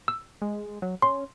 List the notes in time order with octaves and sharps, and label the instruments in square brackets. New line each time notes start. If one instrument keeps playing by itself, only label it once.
[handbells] E6
[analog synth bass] G#3
F#3
[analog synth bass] C#4 [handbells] C6